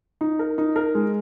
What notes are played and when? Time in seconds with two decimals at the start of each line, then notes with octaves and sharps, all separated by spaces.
0.21 D#4
0.39 A#4
0.58 D#4
0.76 A#4
0.95 G#3